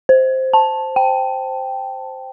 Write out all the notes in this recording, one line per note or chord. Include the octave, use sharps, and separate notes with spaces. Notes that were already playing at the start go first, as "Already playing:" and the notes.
C5
A5
G5